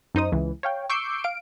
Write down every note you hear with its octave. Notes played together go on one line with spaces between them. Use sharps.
F#2 D#4 C5 D#6
C#2 E3
C#5 F5 G5
C#6 D6 E6 G6 C7 D7
F5 D7